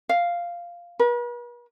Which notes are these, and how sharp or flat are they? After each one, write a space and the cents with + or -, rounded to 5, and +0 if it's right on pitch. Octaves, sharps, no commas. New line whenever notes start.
F5 -5
B4 -45